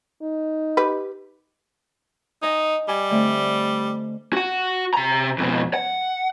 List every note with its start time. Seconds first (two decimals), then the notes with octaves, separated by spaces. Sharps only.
0.22 D#4
0.77 G4 B4
2.42 D#4 D#5 G#5
2.88 G3 G#5
3.10 D3 A3 C4
4.33 F#4 F#5
4.94 C3 A#5
5.38 F2 B2
5.74 F#5